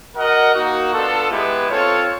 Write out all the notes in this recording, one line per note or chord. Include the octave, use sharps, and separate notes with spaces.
F#4 A#4 D#5 F#5
A#3 D#4 F#4
B3 D4 F4 A4
G#3 B3 E4 G4 B4
C4 F4 A4 C#5